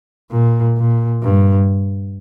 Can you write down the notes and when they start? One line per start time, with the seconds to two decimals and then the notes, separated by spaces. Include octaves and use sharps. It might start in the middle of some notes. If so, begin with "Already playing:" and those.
0.31 A#2
0.77 A#2
1.23 G2